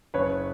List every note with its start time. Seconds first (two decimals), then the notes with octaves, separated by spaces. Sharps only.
0.14 F#1 B4 C#5